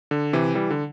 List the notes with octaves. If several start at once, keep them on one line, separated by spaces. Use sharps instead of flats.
D3
C3 E3
E3 G3
D3